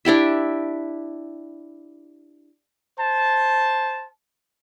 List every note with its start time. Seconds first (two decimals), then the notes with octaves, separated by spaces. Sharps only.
0.05 D4 E4 G4 E5
3.00 C5 A5